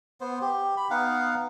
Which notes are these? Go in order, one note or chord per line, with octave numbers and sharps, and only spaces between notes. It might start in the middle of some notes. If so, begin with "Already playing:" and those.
B3 C5
G4
B5
B3 D#4 F5 F#5